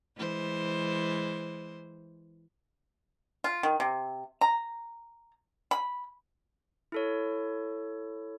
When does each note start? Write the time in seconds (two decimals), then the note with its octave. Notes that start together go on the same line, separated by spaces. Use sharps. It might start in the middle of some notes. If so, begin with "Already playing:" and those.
0.17 E3 G#3 C5
3.44 F4
3.63 D#3
3.80 C3
4.41 A#5
5.71 B5
6.92 E4 A4 C#5